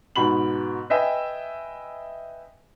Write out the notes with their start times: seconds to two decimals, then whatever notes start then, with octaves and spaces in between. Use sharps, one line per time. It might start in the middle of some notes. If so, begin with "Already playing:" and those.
0.16 G#2 B2 B5 F#7
0.90 B4 D#5 E5 G5 G#5